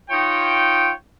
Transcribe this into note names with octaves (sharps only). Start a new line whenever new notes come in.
D#4 F4 C#5 G5